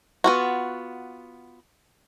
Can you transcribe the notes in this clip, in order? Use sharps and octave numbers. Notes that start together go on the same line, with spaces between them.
B3 F4 F#4